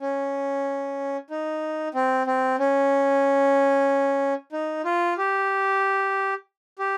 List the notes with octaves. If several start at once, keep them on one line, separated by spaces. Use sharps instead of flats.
C#4
D#4
C4
C4
C#4
D#4
F4
G4
G4